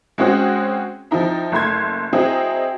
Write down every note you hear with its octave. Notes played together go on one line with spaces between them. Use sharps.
G#3 C4 C#4 F#4 G#4
F3 C4 D#4 E4
F#1 A3 C6 G#6
F#3 C4 E4 G#4 D#5